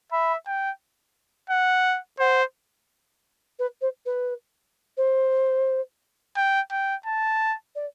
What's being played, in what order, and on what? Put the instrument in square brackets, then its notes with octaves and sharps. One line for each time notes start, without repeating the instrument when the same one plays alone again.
[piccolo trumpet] E5 [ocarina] B5
[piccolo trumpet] G5
F#5
[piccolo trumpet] C5 [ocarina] F#5
[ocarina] B4
C5
B4
C5
[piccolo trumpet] G5
G5
A5
[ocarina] D5